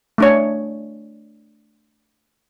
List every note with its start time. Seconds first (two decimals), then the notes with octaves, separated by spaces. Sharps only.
0.18 A3 D4 C#5